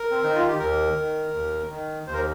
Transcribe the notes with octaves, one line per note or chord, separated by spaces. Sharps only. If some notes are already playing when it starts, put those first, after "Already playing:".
Already playing: A#4
C4
D#3 D#4
F4
G4
D#2 A#4
D#3
D#2
D#3
D#2 C5
A#4